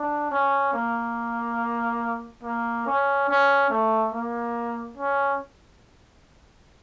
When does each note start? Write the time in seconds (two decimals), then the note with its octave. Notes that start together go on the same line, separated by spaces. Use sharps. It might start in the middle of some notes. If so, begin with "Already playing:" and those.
Already playing: D4
0.31 C#4
0.73 A#3
2.43 A#3
2.86 C#4
3.29 C#4
3.70 A3
4.14 A#3
4.97 C#4